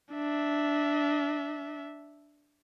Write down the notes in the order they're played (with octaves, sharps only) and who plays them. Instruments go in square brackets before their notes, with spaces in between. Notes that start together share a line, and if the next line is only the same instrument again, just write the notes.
[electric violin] D4 E5